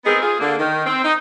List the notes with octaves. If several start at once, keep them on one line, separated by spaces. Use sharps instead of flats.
B3 C4 D#4 G#4 A#4
F4 G#4
D3 A#3
D#3
C4
D#4